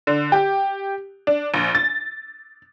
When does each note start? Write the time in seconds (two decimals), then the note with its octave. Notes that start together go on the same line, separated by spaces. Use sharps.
0.07 D3
0.32 G4
1.27 D4
1.54 A#1
1.75 A6